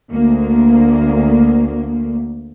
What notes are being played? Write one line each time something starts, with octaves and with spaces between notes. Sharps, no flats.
D2 A#3